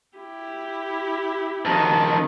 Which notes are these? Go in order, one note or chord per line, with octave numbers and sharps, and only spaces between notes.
E4 G4
F2 D#3 A5